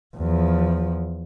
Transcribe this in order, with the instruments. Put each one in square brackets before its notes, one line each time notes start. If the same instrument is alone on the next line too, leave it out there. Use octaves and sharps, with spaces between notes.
[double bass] E2 F3